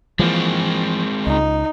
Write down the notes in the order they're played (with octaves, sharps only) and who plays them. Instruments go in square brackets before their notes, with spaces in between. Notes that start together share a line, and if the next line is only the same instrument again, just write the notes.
[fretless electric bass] E3 F3 A#3 [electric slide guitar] G#3 C4
[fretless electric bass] C#2 [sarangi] D#4